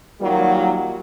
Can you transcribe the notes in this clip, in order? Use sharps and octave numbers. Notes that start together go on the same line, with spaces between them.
D#3 F#3 G3 A#3 F4